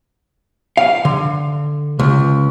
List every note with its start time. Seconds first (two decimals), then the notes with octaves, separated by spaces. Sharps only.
0.77 F5
1.05 D3
1.99 C#2